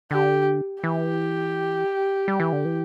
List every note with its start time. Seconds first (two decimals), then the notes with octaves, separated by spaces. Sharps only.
0.11 D3 G4
0.83 E3 G4
2.28 G3
2.40 E3
2.53 D3
2.65 E3